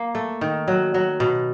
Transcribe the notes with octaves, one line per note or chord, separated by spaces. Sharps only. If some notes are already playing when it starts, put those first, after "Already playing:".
Already playing: A#3
A3
D#3
F#3
F#3
B2